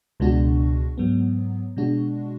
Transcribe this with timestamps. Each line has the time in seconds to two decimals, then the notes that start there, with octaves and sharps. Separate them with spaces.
0.20 C#2 B2 G#3 D4 F#4
0.98 G#2 F#3 B3
1.77 B2 G#3 D4 F#4